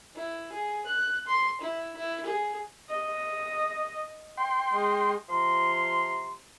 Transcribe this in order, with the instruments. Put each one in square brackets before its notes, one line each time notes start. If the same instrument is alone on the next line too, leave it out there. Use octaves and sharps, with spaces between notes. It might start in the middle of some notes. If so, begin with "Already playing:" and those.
[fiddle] E4
G#4
F#6
C6
E4
E4
G#4
[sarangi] D#5
[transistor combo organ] G5 C6
[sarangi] G#3
[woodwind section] C3 F3 A#5 C6